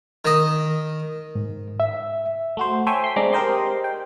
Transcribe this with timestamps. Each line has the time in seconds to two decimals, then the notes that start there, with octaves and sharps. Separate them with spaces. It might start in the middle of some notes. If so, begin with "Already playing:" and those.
0.25 D#3 D#5
1.35 G#2
1.80 E5
2.57 A3 F#4 C5
2.87 A4 C5 C#5 E5 G5 G#5
3.04 C6 B6
3.16 G#3 C4 D4 A#5 D6
3.33 G4 A#4 C5 D#5 C6
3.84 G5